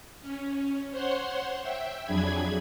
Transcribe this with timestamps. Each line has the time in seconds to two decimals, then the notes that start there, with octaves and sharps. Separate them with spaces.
0.21 C#4
0.91 C5 C#5 F#5 C6
1.63 E5 G5
2.05 F2 F#3 D4 G#4 B5 G#6